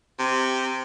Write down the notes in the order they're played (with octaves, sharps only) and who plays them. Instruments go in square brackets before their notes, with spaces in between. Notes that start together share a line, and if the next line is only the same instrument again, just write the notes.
[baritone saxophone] C3